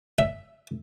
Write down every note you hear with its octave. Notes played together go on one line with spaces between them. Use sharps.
E5